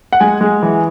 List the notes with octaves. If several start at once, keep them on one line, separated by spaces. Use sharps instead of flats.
F#5
G#3 G#5
G#3
E3